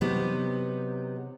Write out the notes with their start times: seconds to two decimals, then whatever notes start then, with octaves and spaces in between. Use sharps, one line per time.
0.01 C3 F#3 B3 D#4 G4